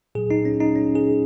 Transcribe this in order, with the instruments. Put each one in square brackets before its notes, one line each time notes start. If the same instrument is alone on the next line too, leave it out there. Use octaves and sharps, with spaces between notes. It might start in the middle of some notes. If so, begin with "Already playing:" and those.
[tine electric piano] A#2 F#3 G#4
D#4
C#4
D#4
C#4
G#4